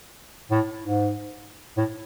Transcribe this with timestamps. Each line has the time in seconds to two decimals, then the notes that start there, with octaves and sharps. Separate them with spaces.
0.51 A2
0.82 G#2
1.77 A2